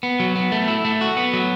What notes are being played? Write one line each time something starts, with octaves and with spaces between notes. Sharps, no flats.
B3
F#3
B3
A3
E4
A3
F#4
B3
F#3